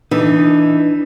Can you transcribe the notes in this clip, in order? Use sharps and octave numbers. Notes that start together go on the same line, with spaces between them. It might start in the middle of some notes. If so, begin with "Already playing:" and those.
E3 D4 D#4